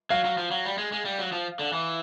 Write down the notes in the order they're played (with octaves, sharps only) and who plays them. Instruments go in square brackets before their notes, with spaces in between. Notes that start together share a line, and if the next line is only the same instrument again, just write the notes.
[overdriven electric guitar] F#3 [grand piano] F5
[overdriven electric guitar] F#3
F3
F#3
G3
G#3
G#3
G3
F#3
F3
D3
E3